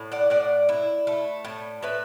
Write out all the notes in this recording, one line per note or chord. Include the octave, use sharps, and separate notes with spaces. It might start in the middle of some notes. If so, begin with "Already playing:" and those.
Already playing: A2
D5 F#5
A2 D5 F#5
E4
A3
A2
A2 B4 E5